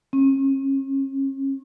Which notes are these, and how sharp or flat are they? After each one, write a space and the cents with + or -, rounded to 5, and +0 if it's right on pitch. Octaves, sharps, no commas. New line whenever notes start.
C#4 -40